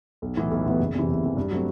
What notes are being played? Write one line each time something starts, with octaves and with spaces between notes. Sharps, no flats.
B1
A2 E3 B3
B1
A2 E3 B3
F#1
E2 C3 E3
F#1
E2 C3 E3
G2
F#3 A3 C4